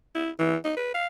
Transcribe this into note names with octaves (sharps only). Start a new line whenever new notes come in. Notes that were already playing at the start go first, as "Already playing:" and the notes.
E4
E3
D#4
B4
F5